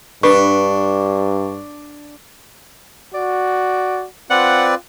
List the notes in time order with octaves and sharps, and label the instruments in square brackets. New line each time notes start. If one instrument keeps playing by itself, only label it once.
[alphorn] G2 [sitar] D4 [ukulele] B4 [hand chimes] C#6
[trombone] F#4 [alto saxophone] D5
[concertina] C4 B4 D5 [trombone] F4 [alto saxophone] F#5